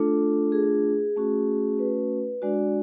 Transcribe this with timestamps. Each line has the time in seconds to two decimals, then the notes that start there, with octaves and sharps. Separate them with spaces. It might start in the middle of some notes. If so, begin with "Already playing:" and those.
Already playing: A3 D4 F4 A4
0.52 G#4
1.16 A3 C#4 F#4
1.79 B4
2.42 G#3 D4 F#4 D5